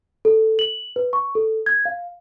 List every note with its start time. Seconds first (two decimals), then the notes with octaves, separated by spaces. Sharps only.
0.25 A4
0.59 F#7
0.96 B4
1.13 C#6
1.35 A4
1.66 G#6
1.85 F5